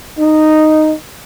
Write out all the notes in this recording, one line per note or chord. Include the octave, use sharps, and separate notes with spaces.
D#4